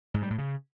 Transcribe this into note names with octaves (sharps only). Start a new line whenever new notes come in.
G#2
G3
A2
C#3